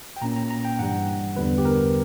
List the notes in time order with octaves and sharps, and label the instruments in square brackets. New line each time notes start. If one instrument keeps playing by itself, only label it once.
[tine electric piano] G5
A#2 A#3 C#4 A#5
A#5
A#5
G5
G2 E3 G3 F#5
E2 D3 G3 B3 B4
G4
A#4